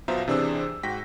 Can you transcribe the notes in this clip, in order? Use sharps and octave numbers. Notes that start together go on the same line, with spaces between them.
B1 B2 F4 C5 E5 A#5
C3 E3 D4 G#4 C5 E6
G#2 F#4 G5 A#6 B6